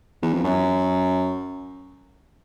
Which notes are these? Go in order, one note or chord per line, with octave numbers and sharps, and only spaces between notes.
E2
F2
F#2